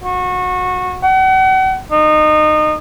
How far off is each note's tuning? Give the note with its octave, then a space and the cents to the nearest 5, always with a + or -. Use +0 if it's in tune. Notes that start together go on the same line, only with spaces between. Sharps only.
F#4 -25
F#5 +40
D#4 -25